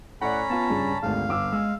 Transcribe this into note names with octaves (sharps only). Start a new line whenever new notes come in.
A2 C#4 D5 F#5 A#5 B5
B3 F4 A5
G2 C#3
G#1 D2 G#2 F5
G1 D6 E6
G#3 E6